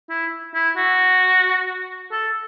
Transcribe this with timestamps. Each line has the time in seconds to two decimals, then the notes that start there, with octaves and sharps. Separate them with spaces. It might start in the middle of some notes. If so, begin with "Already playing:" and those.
0.10 E4
0.54 E4
0.77 F#4
2.12 A4